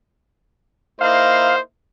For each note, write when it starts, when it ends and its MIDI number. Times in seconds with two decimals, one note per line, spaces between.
1.01 1.58 58
1.01 1.58 63
1.01 1.58 64
1.01 1.60 72
1.01 1.56 77